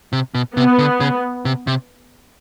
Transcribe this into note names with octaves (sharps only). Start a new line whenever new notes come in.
C3
B2
C3 B3
D3
C#3
C3
C3